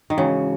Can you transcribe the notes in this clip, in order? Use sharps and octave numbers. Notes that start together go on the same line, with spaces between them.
D#3
G#2 C#3 E3 F#4